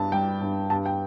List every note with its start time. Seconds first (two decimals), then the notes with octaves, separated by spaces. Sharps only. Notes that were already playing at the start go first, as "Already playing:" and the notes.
Already playing: G2 G3 A5
0.12 G3 G5
0.41 G2
0.70 G2 A5
0.86 G5